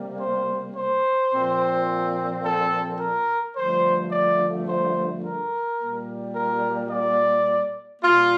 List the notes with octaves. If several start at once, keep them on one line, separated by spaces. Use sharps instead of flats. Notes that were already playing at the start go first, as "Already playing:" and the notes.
Already playing: C3 G3 A#3
C5
C5
A#2 F3 C4
A4
A#4
G2 D3 F3 A3 C5
D5
C5
A#4
A#2 G3 A#3
A#4
D5
A#2 G3 A#3 F4